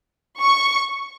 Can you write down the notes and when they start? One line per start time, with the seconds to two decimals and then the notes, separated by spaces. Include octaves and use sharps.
0.41 C#6